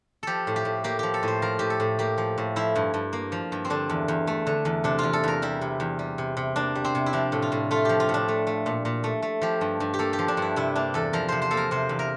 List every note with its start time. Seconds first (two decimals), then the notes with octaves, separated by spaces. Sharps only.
0.23 F3 G4 A4
0.47 A2
0.56 G4
0.65 A2
0.84 A#3 G4
0.99 F3 G4
1.14 A4
1.23 A2 C5
1.42 F3 A#4
1.59 A2 G4
1.70 A4
1.80 A2
1.99 A#3 G4
2.18 F3
2.38 A2
2.56 F3 E4
2.75 G2
2.94 G2
3.13 A#3
3.32 F3
3.52 G2
3.65 C4
3.70 D3 D4
3.90 E2
4.08 E2
4.27 A3
4.47 D3
4.65 E2
4.84 C3 D4
4.99 E2 F4
5.13 A4
5.24 E2 A#4
5.42 G3 E4
5.61 C3
5.80 E2
5.99 G3
6.18 C3
6.37 C3
6.56 A#3 D4
6.75 G3
6.85 C4
6.95 C3
7.06 E4
7.13 F3 D4
7.32 A2
7.42 F4
7.52 A2
7.71 A3 F4
7.85 F3 G4
8.00 F4
8.09 A2
8.14 D4
8.28 A3
8.47 A3
8.66 A#2
8.85 A#2
9.04 A3
9.23 A3
9.42 F3 G4
9.61 G2
9.80 G2
9.94 G4
9.99 A#3 A4
10.13 G4
10.19 F3
10.28 D4
10.37 G2 E4
10.56 C3 E4
10.75 A#3 D4
10.94 E2 A4
11.13 F3 A#4
11.29 C3 C5
11.42 C5
11.51 A#3 A4
11.57 A#4
11.71 C3 C5
11.89 E2
11.99 A#4